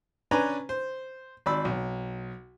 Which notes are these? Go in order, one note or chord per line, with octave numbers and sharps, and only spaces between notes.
C#4 D4 B4 G#5 A#5
C5
G#1 D5 B5 E6
B1